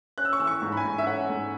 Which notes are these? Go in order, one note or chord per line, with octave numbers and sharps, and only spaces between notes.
C#4 F#6
E6
C#6
E3 E6
C#6
G#2
B5
G#5
G#2
E5
C#4 F#5
G#2